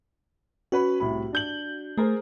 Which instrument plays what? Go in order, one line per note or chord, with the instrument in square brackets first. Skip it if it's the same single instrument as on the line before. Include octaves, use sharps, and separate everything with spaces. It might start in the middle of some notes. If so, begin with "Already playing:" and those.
[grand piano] C#4 B4 B5 [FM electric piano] F#4
[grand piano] C2 A2 B5
D4 G6 F#7
[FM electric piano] A3 [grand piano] G#4 A#4 C5